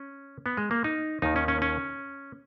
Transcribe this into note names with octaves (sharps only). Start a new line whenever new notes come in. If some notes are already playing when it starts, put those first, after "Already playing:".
Already playing: C#4
B3
G#3
A#3
D#4
D#2 D#3 D#4
C#4
C#4
C#4